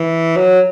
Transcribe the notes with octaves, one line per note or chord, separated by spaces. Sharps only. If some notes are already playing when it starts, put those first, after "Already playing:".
Already playing: E3
F#3